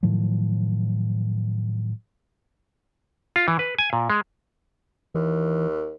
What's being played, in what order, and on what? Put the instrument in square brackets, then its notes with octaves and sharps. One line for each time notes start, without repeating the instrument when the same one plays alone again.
[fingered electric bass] A2 D#3 F3 F#3
[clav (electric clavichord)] F4
E3
B4
G#5
A#2
G#3
[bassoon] D#2 [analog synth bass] E3